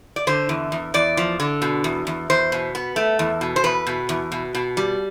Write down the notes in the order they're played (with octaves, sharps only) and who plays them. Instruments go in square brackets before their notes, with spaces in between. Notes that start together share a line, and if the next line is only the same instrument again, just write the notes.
[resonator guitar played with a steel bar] D5
D3 C5
E2
E2
E2 D5
F3
D3
B2
E2
E2
E2 C5
B2
B3
A3
E2
B2
C5
E2 B4
B2
E2
B2
B2
G3